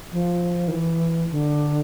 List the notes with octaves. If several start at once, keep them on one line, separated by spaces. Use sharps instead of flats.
F3
D#3
E3
D3